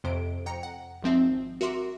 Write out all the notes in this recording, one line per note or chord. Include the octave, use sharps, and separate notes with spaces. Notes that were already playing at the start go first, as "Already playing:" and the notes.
F2 C3 C5 D7
F2 G5 A#5 C#7
F#5
G#1 F3 C4 E5
F#4 A#4 E5 C6 D6